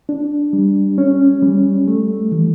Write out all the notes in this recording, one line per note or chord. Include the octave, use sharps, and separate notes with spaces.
D4
G3
C#4
G3
A3
E3